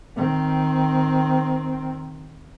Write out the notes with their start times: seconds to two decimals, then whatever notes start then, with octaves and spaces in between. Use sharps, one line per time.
0.16 D#3 C4